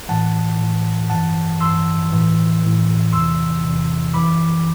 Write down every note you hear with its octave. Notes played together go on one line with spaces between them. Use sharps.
A2 E3 F#5 A5
A2 E3
G2 E3 F#5 A5
G2 E3 C6 E6
A2 E3
A2 E3
E2 C3 E3 C6 E6
E2 C3 E3
F#2 E3 B5 D6